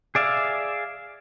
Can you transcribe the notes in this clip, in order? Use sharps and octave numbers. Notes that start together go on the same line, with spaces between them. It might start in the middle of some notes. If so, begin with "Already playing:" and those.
G#4 D5 E5 F5